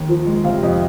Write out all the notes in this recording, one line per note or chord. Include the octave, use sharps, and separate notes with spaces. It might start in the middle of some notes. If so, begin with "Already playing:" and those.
Already playing: D#2
F3
G#3
C3 F5
F2 D#5